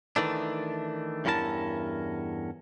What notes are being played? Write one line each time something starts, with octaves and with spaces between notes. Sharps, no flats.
D#3 E3 A3 D4
E2 G2 C#4 E4 A#4 A5